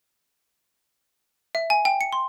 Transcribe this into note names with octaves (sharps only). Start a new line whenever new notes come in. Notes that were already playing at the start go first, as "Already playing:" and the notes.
E5
G#5
G5
C#7
C6